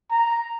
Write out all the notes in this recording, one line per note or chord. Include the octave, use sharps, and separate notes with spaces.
A#5